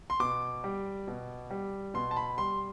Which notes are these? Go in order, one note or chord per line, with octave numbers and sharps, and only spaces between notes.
C6
B2 D6
G3
B2
G3
B2 C6
A5
B5
G3 C6